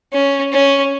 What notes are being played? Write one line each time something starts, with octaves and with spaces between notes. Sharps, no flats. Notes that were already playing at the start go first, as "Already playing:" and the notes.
C#4
C#4